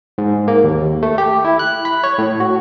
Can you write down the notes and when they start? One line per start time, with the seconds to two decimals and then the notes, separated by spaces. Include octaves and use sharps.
0.18 G#2
0.48 A#3
0.64 D#2
1.03 A3
1.18 G4
1.45 E4
1.59 F#6
1.85 B5
2.04 C#5
2.18 A2
2.40 F#4